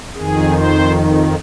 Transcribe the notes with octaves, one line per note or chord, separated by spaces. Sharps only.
F2 D#3 G#4
C5